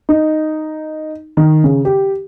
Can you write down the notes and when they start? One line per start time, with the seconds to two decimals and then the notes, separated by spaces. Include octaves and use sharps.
0.09 D#4
1.37 D#3
1.64 C#3
1.85 G4